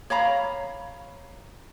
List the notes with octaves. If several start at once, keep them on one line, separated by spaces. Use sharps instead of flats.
C#5 F5 A#5 B5